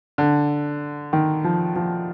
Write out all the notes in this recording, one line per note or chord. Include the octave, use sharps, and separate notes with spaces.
D3
D#3
F3
F3